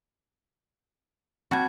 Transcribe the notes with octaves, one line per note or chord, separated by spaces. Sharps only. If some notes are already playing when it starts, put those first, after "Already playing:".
G3 C4 F#4 A5 G#6